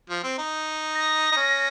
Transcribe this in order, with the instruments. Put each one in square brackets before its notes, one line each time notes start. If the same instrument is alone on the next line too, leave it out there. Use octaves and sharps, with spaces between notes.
[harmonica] F3
C4
D#4
[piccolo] A#6
[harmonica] D#4
C#4